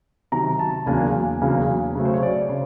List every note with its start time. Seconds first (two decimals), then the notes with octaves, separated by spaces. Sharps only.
0.32 C3 D#3 F#3 A#5
0.59 A5
0.86 E2 C#3 F#3 A#3 D4 G#5
1.41 E2 C#3 F#3 A#3 D4
1.95 C#3 F#3 A3 C4
2.05 C5
2.14 C#5
2.23 D5
2.49 C#3 C5